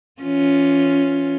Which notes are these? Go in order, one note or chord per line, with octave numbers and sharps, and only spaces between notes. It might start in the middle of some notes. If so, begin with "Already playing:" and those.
E3 C#4 F4